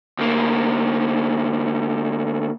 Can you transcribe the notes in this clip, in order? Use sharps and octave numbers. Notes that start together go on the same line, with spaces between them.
D2 A#3